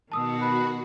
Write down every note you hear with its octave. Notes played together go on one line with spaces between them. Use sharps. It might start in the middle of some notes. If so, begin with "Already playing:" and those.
B2 D#3 F#4 A5 D#6 E6
B4